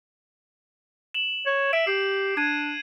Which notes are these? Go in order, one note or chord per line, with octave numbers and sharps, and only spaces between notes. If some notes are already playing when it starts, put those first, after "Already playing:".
E7 F#7
C#5
E5 D7
G4 C7
D4 G#6 D#7